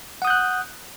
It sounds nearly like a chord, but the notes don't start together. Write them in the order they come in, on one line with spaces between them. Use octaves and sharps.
F#5 D#6 G6 F#6